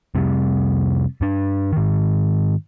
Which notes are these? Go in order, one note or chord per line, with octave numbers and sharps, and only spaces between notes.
F2 C3 G3
G2 D4
G#2 D#3